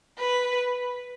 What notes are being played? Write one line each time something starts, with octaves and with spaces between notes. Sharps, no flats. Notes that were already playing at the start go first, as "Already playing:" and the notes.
B4